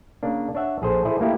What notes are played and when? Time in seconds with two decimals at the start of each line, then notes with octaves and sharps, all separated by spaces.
0.23 C#3 A#3 D4
0.55 D4 C#5 E5 F#5
0.82 A#1 G#4 A4 C5
1.05 E4 G#4 A4 C5 D5
1.20 A3 A#3 E4 G4